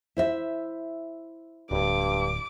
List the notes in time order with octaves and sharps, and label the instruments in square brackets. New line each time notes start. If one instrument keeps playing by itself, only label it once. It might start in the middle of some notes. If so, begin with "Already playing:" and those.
[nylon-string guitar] E4 C5 E5
[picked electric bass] D1 [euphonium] G2 [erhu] D6